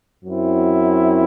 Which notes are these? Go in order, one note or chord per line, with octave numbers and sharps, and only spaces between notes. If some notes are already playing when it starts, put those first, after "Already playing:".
F#2 F#3 C4 E4